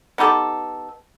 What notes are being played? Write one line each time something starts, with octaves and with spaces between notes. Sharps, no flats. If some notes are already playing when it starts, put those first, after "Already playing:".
B3 D#4 G4 A4